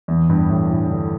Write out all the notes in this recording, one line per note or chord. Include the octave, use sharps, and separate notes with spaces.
E2
G2
A2
A2
D3